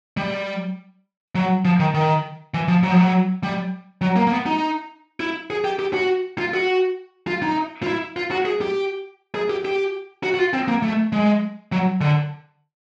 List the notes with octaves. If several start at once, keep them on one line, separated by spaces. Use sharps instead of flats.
G3
F#3
F3
D#3
D#3
E3
F3
F#3
F3
F#3
G3
F#3
A#3
A#3
B3
D#4
E4
G#4
G4
G4
F#4
F4
F#4
F4
D#4
F4
E4
F4
F#4
G#4
G4
G#4
G4
G4
F#4
F#4
F4
C4
A#3
A3
G#3
F#3
D3